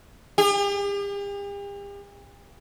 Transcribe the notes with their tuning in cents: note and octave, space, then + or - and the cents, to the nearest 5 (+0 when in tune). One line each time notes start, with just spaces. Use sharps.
G4 +45